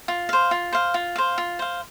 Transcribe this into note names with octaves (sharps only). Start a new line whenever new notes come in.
F4
C5 F5
F4
C5 F5
F4
C5 F5
F4
C5 F5